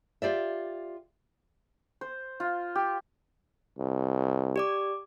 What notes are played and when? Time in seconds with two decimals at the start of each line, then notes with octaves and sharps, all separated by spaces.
0.22 F4 G4 D5 E5
2.01 C5
2.40 F4
2.75 G4
3.78 C2
4.56 G4 D5 D6